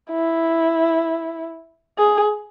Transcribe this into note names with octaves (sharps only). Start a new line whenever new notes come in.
E4
G#4